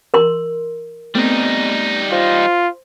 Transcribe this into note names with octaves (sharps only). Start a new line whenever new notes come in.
A#4 C6
G3 A3 B3 C4 D#4
F4 C5